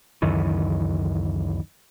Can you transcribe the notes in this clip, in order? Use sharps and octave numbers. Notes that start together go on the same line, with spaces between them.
C#2 F#2 D#3 E3